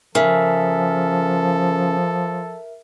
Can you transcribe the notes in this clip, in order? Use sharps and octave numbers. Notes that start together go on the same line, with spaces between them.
C#3 F3 A4 A#4 E5